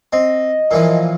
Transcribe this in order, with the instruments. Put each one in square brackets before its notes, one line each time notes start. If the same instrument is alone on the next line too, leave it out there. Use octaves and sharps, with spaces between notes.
[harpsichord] C4 [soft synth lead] D#5
[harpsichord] A#2 E3 F3